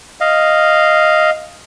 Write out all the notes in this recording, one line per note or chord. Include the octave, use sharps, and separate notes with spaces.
D#5 F5